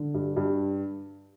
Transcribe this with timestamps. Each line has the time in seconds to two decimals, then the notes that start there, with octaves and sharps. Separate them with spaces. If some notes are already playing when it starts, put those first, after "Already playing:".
Already playing: D3
0.14 G2
0.36 G2